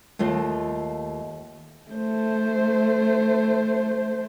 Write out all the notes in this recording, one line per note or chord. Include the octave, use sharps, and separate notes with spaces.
D#2 A3 F4 D#5
A3 C5